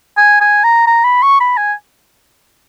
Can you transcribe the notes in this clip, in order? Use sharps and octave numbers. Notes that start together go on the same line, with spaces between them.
G#5
G#5
A#5
A#5
B5
C#6
B5
G#5